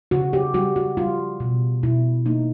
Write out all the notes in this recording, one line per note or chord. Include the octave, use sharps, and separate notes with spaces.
C#3 F#4
G4
G3 F#4
F#4
G3 F4
B2
B2 E4
A#3 D#4